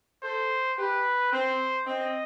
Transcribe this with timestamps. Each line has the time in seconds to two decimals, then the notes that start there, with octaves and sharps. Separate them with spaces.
0.23 A4 C5
0.78 G4 B4
1.32 C4 C5
1.87 C4 D#5